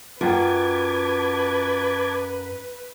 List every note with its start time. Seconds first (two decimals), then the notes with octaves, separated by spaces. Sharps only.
0.21 F#2 F4 B4 F#5 G5 A5 D6 G#6